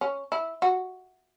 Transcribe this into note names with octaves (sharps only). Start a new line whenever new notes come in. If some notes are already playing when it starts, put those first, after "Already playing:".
C#4
E4
F#4